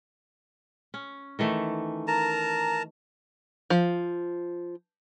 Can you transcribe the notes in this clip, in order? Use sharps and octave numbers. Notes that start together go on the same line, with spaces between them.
C#4
D#3 E3 A3
A#4 A5 A#5
F3